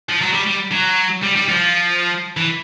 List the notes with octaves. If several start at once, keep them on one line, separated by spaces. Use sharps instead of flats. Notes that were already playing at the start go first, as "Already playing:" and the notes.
F3
F#3
G3
G3
F#3
G3
G3
F3
E3